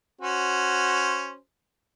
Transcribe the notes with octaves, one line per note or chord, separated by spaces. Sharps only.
C#4 F#4 C5